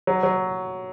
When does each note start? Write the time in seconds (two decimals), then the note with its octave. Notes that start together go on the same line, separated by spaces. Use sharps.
0.07 F#3
0.23 F#3